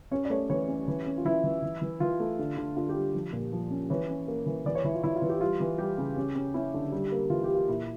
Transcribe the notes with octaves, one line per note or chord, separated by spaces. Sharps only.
C#4 C#5
D5
A3 C#5
E3 C#5
C#4
E3
C#4
F4
E3 E4
E3
E3
E3
E3 F4
A3
D3
D3
D3 F4
G4
G3
F3
A#2
F3
C#4
E3 C#5
C#4
A#3
E3
E3 D5
C#5
E3 E4
F4
E3 E4
F4
E3
G4
G3 F4
E3
G3 G4
C#3
C#4
C#4
C#4 E4
D3
G3
A#3
E3 F4
G4
A#3
F4
A#2 E4